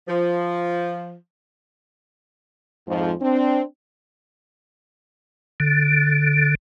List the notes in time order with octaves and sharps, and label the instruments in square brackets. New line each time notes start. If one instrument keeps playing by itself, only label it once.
[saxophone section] F3
[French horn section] F2 G#2 F3
C4 D4
[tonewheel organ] D3